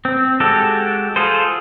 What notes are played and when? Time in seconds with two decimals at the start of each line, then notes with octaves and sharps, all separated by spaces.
0.05 C4
0.40 G#3 F#4 G4 A4
1.16 F4 G#4 A4 C5